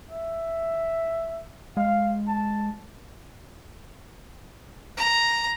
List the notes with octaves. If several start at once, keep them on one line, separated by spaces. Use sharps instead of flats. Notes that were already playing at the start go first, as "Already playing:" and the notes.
E5
G#3 F5
A5
A#5